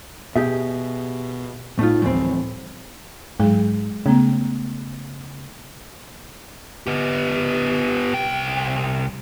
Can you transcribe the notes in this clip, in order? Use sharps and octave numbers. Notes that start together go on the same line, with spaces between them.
B2 G4 G#4 E5
A2 A3 D#4 F4
D2 A2 E3 F3 G3 C4
G#2 F#3 G#3 G#4
C#3 A3 B3
B3 G4
C2 G5